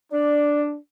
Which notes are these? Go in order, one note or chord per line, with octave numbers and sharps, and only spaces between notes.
D4 D5